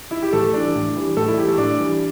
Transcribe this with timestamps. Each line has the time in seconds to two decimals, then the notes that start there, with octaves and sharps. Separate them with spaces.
0.11 E4
0.22 G4
0.33 A2 A3 A4
0.53 E3 G3 D4 D5
0.75 A2
0.96 E3 G3
1.16 A2 A3 A4
1.28 E4
1.37 E3 G3 G4
1.48 A3 A4
1.58 A2 D4 D5
1.79 E3 G3